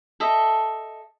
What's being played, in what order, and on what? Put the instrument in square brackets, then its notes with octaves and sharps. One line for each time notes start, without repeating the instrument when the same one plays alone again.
[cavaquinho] A4 D#5 E5